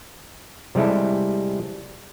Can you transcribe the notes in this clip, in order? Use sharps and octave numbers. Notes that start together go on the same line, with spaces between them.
C3 G3 G#3 E4 A4